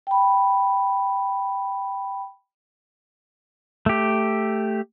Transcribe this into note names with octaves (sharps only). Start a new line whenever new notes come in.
G5 B5
A3 G4